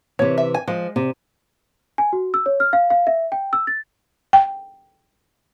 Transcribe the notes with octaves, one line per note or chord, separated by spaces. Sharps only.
C3 E3 C#5
E5
G#5
F3 G#3
C3
G#5
F#4
E6
C#5
F6
F5
F5
E5
G5
E6
A6
G5